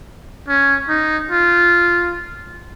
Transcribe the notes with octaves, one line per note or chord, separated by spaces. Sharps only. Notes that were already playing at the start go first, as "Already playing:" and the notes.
C#4
D#4
F4